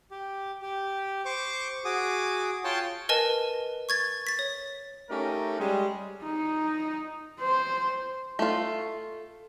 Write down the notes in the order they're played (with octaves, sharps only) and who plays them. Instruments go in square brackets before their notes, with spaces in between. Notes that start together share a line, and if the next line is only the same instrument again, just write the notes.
[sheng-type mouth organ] G4
G4
C5 C#6 D6
F#4 G#4 D6 D#6
F4 C#5 G5 A5 C6
[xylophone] A#4 B4 D#5 G#5 A5
C#6 G#6 A6
A6 B6
C#5
[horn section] A3 C#4 D#4 G4 A#4
G3 G#3
[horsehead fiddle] D#4
C5
[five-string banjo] A3 F4